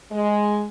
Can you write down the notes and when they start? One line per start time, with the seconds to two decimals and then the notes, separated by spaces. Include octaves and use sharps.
0.12 G#3